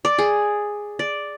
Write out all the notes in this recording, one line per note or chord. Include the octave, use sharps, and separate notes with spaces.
D5
G#4
D5